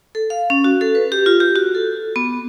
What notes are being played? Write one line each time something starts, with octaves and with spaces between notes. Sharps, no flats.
A4
F5
C#4
F#4
A4
B4
G4
F4
G4
F#4
A4
B3